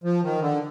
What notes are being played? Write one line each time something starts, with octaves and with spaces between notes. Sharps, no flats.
F3
D#3
D3